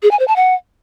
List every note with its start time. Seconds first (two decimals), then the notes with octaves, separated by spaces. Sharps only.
0.03 G#4
0.11 G#5
0.19 C5
0.28 A5
0.36 F#5